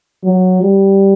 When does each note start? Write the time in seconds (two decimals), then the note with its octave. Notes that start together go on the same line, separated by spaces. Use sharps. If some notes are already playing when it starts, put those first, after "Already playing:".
0.24 F#3
0.62 G3